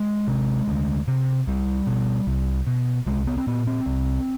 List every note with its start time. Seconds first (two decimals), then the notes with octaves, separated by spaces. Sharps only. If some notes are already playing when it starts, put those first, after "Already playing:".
Already playing: G#3
0.28 C3
0.68 D2
1.08 C3
1.47 C2 G3
1.87 B2
2.27 C2
2.67 B2
3.06 C2 G#3
3.27 B3
3.38 C4
3.47 A#2 B3
3.67 C4
3.86 C2